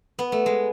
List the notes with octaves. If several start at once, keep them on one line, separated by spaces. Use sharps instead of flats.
B3
A3
G#3